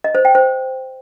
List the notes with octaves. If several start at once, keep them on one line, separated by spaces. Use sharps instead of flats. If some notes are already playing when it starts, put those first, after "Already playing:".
D#5
C5
G5
C5